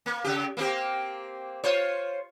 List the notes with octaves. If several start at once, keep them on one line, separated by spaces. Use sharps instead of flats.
A#3
C#3 G4
A#3 C4 G4
F4 C5 C#5